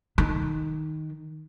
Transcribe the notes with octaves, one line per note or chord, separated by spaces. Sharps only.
D#3